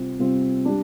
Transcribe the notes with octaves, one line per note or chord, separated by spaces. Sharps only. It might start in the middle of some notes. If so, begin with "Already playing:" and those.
Already playing: C3 G3 C4 F4
C3 G3 C4 F4
G3 D4